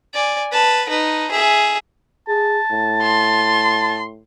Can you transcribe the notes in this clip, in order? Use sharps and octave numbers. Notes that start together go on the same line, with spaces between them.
D5 G#5
B4 A5
D#4 B4
G#4 E5
G#4 A5
A2
C6